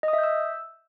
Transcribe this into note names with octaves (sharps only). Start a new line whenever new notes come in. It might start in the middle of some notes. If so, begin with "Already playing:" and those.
D#5
D#6
E5
G6
E6